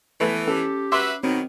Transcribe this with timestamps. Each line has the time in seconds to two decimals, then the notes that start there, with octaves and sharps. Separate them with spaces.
0.21 E3 A3 B3
0.48 C#4 G4 A4
0.92 F#4 B4 E5 C6 D6
1.24 B2 D#3 F#3 C4 D#4